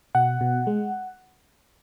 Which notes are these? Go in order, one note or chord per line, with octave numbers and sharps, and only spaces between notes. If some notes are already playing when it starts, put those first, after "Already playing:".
B2 F#5
B2
G#3